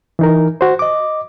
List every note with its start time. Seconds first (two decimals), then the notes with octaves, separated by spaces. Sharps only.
0.19 E3 D#4 A#4
0.61 F#4 C5
0.79 D#5 D6